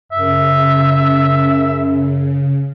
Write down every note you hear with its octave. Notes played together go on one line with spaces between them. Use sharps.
F#2 C#3 E5